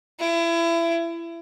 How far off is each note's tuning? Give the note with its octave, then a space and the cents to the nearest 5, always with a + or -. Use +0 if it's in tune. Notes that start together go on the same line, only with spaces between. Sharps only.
E4 +30